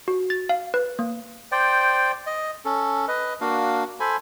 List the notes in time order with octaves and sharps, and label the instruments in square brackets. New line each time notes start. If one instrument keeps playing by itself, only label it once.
[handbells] F#4
A6
F5
B4
A#3
[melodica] C5 D5 G5
D#5
C#4 A4
B4 D#5
A#3 D4 F#4 F5
A4 C5 G#5 B5